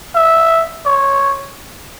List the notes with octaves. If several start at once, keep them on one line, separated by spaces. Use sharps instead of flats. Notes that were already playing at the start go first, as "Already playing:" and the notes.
E5
C#5